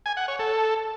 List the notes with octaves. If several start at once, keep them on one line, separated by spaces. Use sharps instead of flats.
G#5
F#5
C#5
A4